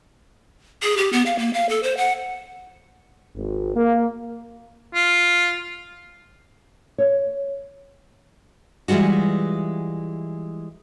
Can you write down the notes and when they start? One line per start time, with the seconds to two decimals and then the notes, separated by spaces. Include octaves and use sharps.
0.83 G#4
0.97 G4
1.13 B3
1.26 F5
1.39 A#3
1.54 F5
1.69 A4
1.83 C5
1.97 F#5
3.35 G#1
3.76 A#3
4.95 F4
6.98 C#5
8.88 E3 G3 G#3 F4 F#4